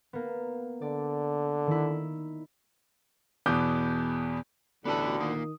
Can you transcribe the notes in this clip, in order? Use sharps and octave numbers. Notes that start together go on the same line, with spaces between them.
A#3 B3
D3 D5
D#3 E4
E2 B2 B3 D6 G6
A1 D2 D3 B3 F#4 B4 A5 B5
D#3 A#3 F4 D#6